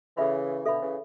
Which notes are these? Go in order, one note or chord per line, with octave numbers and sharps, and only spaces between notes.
C#3 E3 A4 E5 B5
B2 D3 A4 E5 B5
C#3 E3